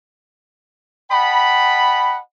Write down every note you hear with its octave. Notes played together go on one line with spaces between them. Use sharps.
D#5 F#5 G5 A5 B5